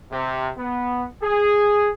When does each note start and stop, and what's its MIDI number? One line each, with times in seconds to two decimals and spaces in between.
0.11 0.49 48
0.56 1.04 59
1.22 1.88 68